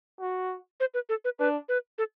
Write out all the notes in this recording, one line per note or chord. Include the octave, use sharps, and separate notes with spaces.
F#4
C5
B4
A4
B4
D4 B4
B4
A4